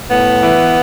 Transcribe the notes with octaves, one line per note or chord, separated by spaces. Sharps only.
A2 B3
E3